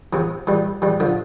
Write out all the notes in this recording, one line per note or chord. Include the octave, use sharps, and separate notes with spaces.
C3 E3
E3 G3
E3 G3
D3 F3